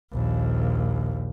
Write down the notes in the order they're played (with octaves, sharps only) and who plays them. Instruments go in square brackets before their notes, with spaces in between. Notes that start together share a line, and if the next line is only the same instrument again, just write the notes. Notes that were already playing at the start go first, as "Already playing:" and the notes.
[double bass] A#1 D#2